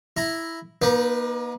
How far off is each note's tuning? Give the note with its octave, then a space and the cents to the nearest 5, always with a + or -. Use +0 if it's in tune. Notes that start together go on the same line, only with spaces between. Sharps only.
E4 +0 A#5 +0
A#3 +40 D#4 +5 B4 +0